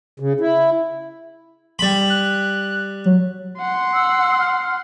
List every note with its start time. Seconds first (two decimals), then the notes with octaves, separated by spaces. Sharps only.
0.20 C#3
0.40 E4
1.79 G3 B5
2.10 F#6
3.06 F#3
3.59 F#5 C6
3.93 E6
4.39 F6